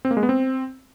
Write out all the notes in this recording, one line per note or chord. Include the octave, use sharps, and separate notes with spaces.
C4
A#3
G#3
B3
C4